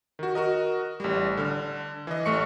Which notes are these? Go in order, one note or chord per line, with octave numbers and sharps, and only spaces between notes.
D#3 F#4
F#4 A#4 D#5
A1 G3
D3 F6
E3 D#5
A1 A3 C#6 C#7